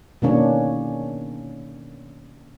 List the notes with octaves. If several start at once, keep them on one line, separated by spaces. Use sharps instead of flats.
B2 D#3 A#3 C#4 D4 C#5